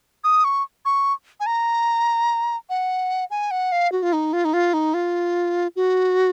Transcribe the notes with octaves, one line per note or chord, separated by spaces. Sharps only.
D#6
C#6
C#6
G#5
A#5
F#5
G#5
F#5
F5
F#4
F4
D#4
F4
D#4
F4
D#4
F4
F#4